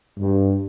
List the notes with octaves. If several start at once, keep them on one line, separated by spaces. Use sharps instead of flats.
G2